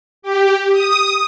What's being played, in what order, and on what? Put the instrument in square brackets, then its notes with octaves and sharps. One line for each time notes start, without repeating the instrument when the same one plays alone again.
[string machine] G4
D#6